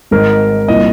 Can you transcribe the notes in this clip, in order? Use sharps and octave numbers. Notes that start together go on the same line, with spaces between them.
G#1 G#2 D#3 A#4
C2 A#2 D#5